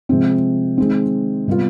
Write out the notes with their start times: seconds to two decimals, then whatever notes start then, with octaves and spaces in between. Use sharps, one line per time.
0.09 C3 F3 G#3 C4
0.78 D#3 G#3 C4
1.47 C3 G3 B3 F4